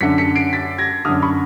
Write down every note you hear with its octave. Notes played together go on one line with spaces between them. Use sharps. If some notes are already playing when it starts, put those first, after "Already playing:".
F#2 D3 B6 C#7
B6 C#7
C7 D7
A6 B6
G#6 A#6
F#2 D3 D#6 F6
B5 C#6